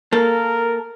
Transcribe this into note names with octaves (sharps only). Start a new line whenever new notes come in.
A#3 A4 A#4